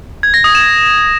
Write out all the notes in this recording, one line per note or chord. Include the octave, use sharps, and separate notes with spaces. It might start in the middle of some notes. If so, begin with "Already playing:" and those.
G#6
A#6
D#6
E7